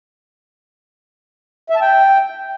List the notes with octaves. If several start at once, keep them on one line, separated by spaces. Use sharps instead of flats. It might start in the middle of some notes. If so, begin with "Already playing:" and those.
E5
A5
G5